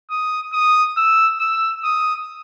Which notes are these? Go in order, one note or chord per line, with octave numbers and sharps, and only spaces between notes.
D#6
D#6
E6
E6
D#6